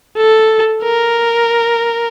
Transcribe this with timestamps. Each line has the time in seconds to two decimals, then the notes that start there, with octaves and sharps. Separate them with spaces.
0.17 A4
0.83 A#4